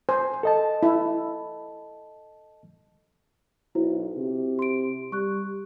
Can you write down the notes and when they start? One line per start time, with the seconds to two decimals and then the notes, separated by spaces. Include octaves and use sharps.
0.09 C5 G#5
0.43 A4 D#5 A5
0.83 E4
3.75 B1 E4 F#4 C5
4.17 C3
4.59 C6 D7
5.12 G3 C#6 F#6